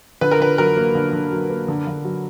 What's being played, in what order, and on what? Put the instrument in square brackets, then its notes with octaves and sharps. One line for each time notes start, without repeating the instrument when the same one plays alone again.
[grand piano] D3 [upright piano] B4
[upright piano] A#4
[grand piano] D3 [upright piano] B4
[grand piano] F#3 [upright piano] A#4
[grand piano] A#3
D3
D3
F#3
A#3
D3
D3
F#3